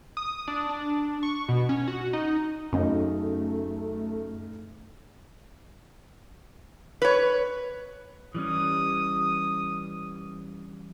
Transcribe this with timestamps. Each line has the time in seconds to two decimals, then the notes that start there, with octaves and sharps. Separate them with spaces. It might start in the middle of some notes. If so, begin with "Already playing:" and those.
0.17 D#6
0.48 D4
0.69 D4
1.23 C#6
1.48 B2
1.69 C#4
1.88 F#4
2.13 D#4
2.73 F#2 C#3 A3 D#4
7.02 B4 C#5
8.35 E3 G3 C#4 D#6